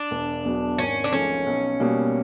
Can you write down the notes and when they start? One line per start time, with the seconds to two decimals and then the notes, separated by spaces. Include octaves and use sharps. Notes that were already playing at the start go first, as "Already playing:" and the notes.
Already playing: D4
0.11 E1
0.45 E2 B2 F#3
0.78 G#1 C#4
1.04 D4
1.12 G#2 F3 A3 C#4
1.46 B1
1.80 B2 G3 A#3